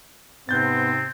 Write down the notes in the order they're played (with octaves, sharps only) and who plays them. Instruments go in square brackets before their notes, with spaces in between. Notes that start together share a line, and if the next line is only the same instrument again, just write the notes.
[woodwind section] G#2 C3 [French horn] B3 [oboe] C4 [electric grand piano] F#6 G6 A6